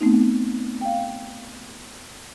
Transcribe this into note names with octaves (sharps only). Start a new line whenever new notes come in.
A3 B3 C4 D#4
F5 G5